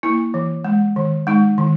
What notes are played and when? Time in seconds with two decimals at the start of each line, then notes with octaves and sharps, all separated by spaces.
0.03 A#3 E4
0.34 E3
0.65 G#3
0.96 D#3
1.27 G#3 D#4
1.58 D#3